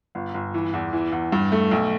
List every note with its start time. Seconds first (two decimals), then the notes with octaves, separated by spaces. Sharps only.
0.15 G1
0.34 G1
0.54 E3
0.73 E2
0.93 E3
1.12 E2
1.32 G2
1.52 A3
1.71 B1